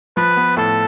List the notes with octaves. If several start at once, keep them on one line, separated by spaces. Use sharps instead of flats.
F3 B4
B3
A2 A4